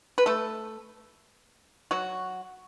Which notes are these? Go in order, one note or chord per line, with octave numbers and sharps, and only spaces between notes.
B4
A3 A4
F#3 F#4